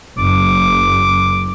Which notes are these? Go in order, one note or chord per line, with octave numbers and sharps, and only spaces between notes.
F#1 D6